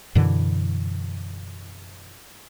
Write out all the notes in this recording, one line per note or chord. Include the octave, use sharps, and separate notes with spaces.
F#2 B2 D3 E3